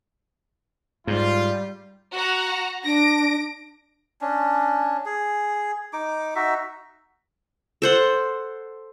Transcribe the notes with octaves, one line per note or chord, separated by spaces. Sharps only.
G#2 G3 F4
F#4 F#5 A#5
D4 A#6 D7
C#4 D4
G#4
D#4 D6
D#4 F#4 E5
A4 C5 F#5